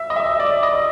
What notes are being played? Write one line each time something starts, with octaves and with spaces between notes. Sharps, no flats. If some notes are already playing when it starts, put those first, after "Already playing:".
Already playing: E5
D#5
E5
D5
D#5